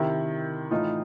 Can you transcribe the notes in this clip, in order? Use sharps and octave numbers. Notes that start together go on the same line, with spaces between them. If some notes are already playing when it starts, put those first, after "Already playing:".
Already playing: C3 D#3 E4
A2 E3 D#4 F4